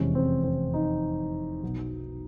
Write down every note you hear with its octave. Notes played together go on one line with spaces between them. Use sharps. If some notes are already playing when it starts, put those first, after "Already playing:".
Already playing: F1 E2 C3 E3 G#3 C#4
C4
C4
D#4
B1 B2 F#3